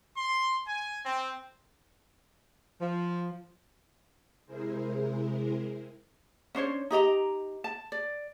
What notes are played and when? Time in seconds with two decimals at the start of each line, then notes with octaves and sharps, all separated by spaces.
0.17 C6
0.67 G#5
1.06 C4
2.81 F3
4.46 C3 G#3 E4 G#4 A#4 C5
6.55 C#4 D4 C5 C#5
6.91 D#4 G4 D#5 A#5
7.64 A5
7.92 D5